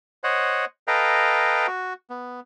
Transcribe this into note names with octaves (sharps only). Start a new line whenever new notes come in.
C5 C#5 D#5 F#5
A4 B4 D#5 F5 G5 A#5
F#4
B3